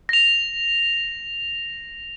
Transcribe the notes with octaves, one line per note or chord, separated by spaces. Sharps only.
A#6 F7